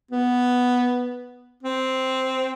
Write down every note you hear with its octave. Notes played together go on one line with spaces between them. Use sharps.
B3
C4